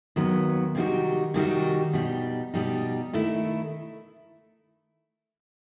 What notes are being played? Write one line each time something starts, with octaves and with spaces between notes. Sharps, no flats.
D#2 D#3 F#3 B3
C3 D#3 G3 D#4 F#4
C3 D#3 G3 D#4 F#4
B2 G3 D#4
B2 G3 D#4
D#3 A3 E4